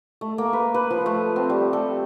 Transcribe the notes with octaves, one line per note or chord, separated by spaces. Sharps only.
A3
A#3
B4
B4
F3
A3
C4
G3
A4